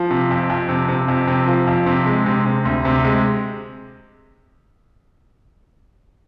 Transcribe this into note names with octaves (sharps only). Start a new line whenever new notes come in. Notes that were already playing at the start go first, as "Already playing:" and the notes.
Already playing: F3
C3
F2
F2
C3
C3
F2
C3
F3
F2
C3
G#3
C3
C3
D2
C3
G#3